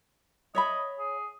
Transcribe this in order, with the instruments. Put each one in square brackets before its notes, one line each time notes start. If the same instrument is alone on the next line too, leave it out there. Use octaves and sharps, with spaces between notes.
[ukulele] C#5 E5 B5 [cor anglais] D#5
[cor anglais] G#4